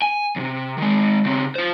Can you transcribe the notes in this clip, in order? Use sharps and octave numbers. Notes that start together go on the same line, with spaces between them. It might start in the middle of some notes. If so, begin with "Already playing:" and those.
G#5
D#2 C3
D#3 G#3
C#3 C4
F4 C5